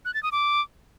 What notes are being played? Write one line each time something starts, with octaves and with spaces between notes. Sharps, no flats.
F#6
A6
D#6
D6